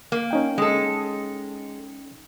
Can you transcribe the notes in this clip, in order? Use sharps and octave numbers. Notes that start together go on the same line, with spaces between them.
A#3
C#4 D#4 G5
G#3 A4